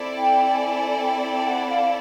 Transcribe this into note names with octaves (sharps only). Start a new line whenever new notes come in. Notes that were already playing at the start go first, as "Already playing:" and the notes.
Already playing: C4 E4 A4 D5
G5
G#5
G#5
G5
G5
F#5
F5